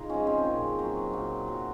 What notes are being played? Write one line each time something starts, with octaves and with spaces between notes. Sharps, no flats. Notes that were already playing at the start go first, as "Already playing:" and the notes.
Already playing: D#4 F4 G#4
F3 G#3 C#4
C4
A#2
F#3
A#2
F#3